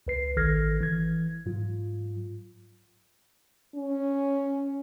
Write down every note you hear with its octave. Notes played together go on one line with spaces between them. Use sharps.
C#2 B4 C7
A1 D#3 A4 F6 G#6 A#6
E3 G#6
G#2 F#3 F4
C#4